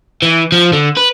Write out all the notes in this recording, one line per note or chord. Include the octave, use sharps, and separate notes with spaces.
E3
F3
D3
B4